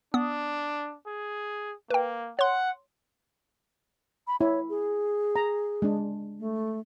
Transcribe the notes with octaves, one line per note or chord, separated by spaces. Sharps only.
B3 D4 D#6
G#4
A#3 B4 G5
C#5 F#5 C6
B5
E4 C#5
G#4
A#5
G#3 D4
A3